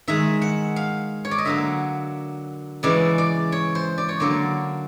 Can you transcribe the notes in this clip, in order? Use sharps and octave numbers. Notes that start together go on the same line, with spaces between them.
D#3 G#3 E5
F#5
F5
C#5
D5
D#5
D3 F#3 A#3 E5
C#3 E3 G#3 D5
D5
C#5
C5
D5
C#5
D3 F#3 A#3 D5